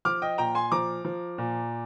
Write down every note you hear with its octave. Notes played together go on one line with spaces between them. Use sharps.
F3 D6 F6
D#5 G5
A#2 G5 A#5
G#5 C6
F3 A#5 D6
F3
A#2